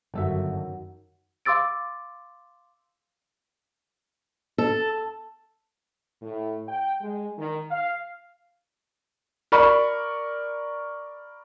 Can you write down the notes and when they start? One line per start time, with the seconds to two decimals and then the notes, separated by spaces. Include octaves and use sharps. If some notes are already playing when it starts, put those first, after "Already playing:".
0.14 G1 F#2 D#3 F#4 A4 E5
1.45 F5 C6 D6 E6 A6 D7
4.58 A4
6.22 A2
6.68 G5
7.01 G#3
7.38 D#3
7.71 F5
9.52 A#4 D5 B5 C#6